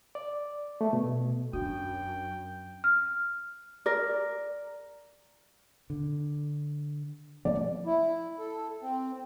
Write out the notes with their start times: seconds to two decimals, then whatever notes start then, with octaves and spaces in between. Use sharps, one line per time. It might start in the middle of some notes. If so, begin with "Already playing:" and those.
0.15 D5
0.81 A3
0.93 B2
1.53 F#2 D4 F#4 G5
2.84 F6
3.86 A#4 D5
5.90 D3
7.45 F3 A3 A#3 D5
7.86 E4
8.38 A4
8.82 C4